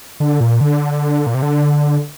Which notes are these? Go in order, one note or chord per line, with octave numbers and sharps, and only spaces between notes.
D3
A#2
D3
A#2
C3
D3